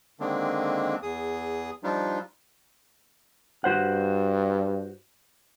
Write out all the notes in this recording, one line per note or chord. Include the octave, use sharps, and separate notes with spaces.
D3 D#3 G#3 A#3 C4 D4
E2 G#4 D#6
F3 G3 D4 D#4 F4
G2 F#4 C5 F#5